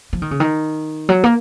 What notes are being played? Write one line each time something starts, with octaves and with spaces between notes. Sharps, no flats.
F3
D#3
C#3
D#3
F#3
A#3